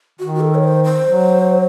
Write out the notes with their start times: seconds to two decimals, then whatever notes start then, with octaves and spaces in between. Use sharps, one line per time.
0.19 D#3 F#4
0.35 F#4
0.41 A4
0.55 C#5
0.63 C5
0.84 C5
1.06 F#3